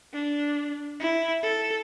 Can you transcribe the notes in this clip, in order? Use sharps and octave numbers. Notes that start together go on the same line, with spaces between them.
D4
E4
A4